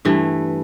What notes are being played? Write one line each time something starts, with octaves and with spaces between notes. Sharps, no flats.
G2 E3 A3